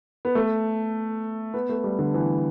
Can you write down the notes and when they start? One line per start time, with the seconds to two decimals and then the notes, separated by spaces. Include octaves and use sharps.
0.25 B3
0.35 A3
1.54 B3
1.69 A3
1.84 G3
1.99 D3
2.14 E3